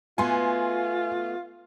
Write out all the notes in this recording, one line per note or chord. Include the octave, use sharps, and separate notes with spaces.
A3 B3 F4 F#4 G#5 C6